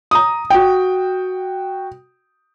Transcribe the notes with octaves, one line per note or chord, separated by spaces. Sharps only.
A#5 D#6
F#4 G5